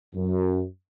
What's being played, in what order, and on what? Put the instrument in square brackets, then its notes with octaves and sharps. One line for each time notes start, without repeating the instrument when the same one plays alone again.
[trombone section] F#2